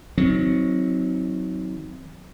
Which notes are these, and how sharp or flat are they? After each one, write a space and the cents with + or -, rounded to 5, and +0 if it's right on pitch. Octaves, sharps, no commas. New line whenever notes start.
D#3 +30 F#3 +0 C4 +0